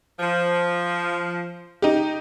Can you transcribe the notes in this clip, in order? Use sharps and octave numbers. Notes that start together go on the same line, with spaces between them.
F3
D#4 G4